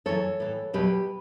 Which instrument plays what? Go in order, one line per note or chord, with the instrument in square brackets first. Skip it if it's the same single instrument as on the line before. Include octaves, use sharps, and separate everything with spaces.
[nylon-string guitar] F#2 E3 A4 C#5
A2 E3
E2 B2 F#3 G4 B4